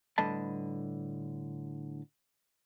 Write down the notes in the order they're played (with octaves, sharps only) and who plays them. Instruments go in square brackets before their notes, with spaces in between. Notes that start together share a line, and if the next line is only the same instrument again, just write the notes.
[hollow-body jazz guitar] A2 D3 G3 B4 D#5 A5